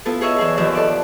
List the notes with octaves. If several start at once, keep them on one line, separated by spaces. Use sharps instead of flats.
B3 E4 F4 A4
G#4 C#5 D#5 E5
E2 G#4
D#2 D#3 F3 E5
A4 D5